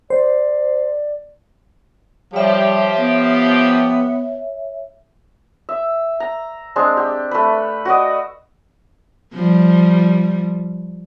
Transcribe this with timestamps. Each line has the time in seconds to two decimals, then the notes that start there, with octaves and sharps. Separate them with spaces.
0.10 C5 D5
2.33 F3 G3 G4 C#5 E5
2.99 B3
5.69 E5
6.20 A#5
6.76 G#3 C4 D4
6.97 G4
7.31 A3 B4
7.85 F#4 B4 D5 D#5
9.34 F3 G3